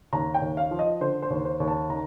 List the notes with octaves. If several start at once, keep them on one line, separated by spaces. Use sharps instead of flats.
D#2 A#5
G5
D#2
F5
F3
D#5
D3 C5
C5
D#2
C5
D#2
A5
D#3 A#5